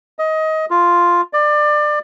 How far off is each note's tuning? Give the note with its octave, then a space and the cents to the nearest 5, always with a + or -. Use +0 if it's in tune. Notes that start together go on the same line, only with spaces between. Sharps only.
D#5 +20
F4 +0
D5 +25